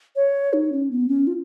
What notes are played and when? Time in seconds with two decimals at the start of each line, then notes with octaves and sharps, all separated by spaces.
0.16 C#5
0.53 D#4
0.72 C#4
0.91 B3
1.08 C#4
1.27 F4